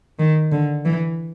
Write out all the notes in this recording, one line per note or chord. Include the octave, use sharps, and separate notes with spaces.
D#3
D3
E3